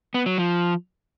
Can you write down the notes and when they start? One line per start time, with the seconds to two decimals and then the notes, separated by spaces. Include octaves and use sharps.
0.14 B3
0.26 F#3
0.38 F3